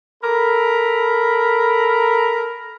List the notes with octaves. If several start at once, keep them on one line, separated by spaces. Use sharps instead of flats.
A4 A#4 B5